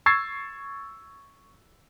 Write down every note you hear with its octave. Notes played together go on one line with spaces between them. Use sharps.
C#6 E6 G#6 A6 C7